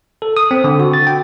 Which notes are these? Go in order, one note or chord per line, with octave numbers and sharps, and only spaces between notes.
A4
D#6
C4
D3
F#4
A6
G5